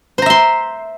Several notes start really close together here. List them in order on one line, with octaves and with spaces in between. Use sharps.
C5 A#5 E5 C6